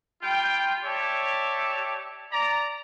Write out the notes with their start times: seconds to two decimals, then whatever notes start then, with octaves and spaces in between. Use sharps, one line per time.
0.22 G3 F4 G5
0.85 G4 C#5 D5 E5 A5
2.32 D5 A#5